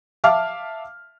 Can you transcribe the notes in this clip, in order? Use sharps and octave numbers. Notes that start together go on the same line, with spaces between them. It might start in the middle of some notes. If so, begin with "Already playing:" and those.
E5 F5 A5 D6 F6